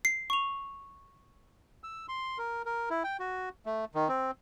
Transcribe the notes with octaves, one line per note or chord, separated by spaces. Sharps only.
C7
C#6 F7
E6
C6
A#4
A#4
E4
G5
F#4
A3
D#3
C4